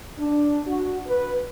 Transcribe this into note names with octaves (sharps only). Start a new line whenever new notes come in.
D4
F#4
B4